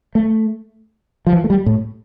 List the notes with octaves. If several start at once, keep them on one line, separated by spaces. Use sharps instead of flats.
A3
F3
E3
A3
G3
A2